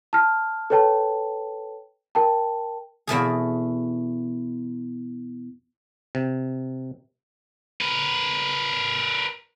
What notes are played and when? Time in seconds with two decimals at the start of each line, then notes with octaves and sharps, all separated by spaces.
0.13 A5 F6
0.70 A4 B4 C#5 G5 A5
2.15 A#4 G5 A5
3.07 E2 B2 A3 G#4
6.15 C3
7.81 A#4 B4